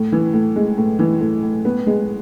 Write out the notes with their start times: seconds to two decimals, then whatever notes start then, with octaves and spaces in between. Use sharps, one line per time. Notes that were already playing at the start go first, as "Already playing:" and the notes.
Already playing: A2
0.12 E3
0.34 A2
0.56 G#3
0.78 A2
0.99 E3
1.21 A2
1.43 A2
1.65 B3
1.87 G#3